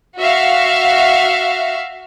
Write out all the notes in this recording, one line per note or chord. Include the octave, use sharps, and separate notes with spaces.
F#4 E5 F5